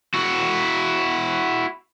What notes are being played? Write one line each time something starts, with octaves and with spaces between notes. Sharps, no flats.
E4 F#4